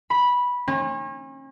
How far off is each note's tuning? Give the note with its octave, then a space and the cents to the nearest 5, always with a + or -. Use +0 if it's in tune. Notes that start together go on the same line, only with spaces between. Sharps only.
B5 -10
C#4 -40